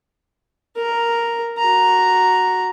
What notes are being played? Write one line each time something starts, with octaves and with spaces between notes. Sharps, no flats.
A#4 A#5
F#4 A#5